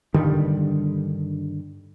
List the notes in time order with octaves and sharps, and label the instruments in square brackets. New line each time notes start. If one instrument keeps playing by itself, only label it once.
[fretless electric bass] G2 D3 D#3 G3